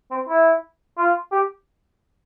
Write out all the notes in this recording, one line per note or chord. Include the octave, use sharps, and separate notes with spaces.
C4
E4
F4
G4